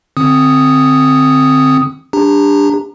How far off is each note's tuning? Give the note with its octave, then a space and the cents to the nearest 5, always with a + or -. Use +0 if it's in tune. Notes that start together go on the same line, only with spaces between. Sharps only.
D3 +30 C4 +0 D#6 +0
D4 +0 G4 +35 A#5 -10